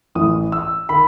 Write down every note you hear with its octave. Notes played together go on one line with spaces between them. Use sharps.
A1 A2 E3 D#6
E6
D#3 B5